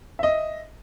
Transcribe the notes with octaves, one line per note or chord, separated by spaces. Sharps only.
D#5 E5